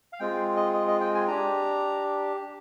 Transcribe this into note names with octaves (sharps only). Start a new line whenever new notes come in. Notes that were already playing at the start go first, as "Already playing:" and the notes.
F5
G#3 C4 F4 G5
D#5
D#5
D#5
G5
G#5
D4 G4 A#5